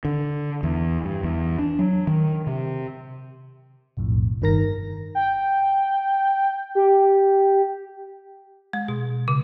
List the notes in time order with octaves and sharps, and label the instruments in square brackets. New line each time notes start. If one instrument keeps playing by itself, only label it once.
[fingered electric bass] D3
E2
G2
E2
D4
F#3
D#3
C3
[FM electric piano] B1 F2 A2
G1 G2 D#3 A#4 A#5 A#6
[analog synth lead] G5
G4
[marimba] G#3
B2
C#3